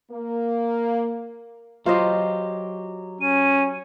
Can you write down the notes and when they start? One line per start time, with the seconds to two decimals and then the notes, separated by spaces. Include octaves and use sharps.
0.11 A#3
1.86 F#3 F4 G4 C5 D#5
3.21 C#4 D#7